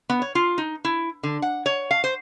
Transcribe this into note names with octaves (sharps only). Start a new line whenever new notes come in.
B3
C#5
F4
D#4
E4
D3
F#5
C#5
F5
C5